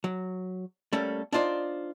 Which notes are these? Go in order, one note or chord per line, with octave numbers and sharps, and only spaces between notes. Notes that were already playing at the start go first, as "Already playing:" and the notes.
F#3
G3 A3 A#3 C#4 A4
D4 D#4 F4 C5 D5